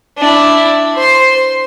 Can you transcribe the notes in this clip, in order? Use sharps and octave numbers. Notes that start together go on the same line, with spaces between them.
D4 E4
C5 C6